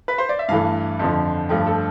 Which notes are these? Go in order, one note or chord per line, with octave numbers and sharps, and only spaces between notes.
B4
C5
D5
E5
G2 E3 A3 F5
F2 D3 F3
G2 F3 A3 G5
A4